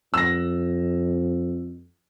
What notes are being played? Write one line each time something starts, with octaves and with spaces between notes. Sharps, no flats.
F2 E6 A#6